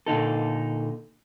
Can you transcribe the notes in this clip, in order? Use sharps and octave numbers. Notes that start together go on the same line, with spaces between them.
A#2 D3 D#4 A4